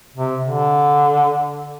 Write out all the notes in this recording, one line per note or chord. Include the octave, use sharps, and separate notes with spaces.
C3
D3